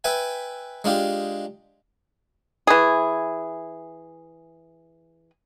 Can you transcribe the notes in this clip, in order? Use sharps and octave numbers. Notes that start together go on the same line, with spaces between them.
B4 E5 G5 G#5
G#3 D4 F4 G4
E3 G#4